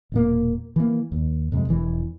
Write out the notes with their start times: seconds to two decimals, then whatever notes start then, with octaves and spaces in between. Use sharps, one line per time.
0.12 E1 A#2 A#3
0.76 E3 A#3
1.12 D#2
1.52 F2 C3 G#3
1.69 E1 E3